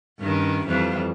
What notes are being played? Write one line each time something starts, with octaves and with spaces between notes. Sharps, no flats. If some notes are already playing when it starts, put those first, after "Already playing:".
G2 D#3 C#4
F2 E3 G3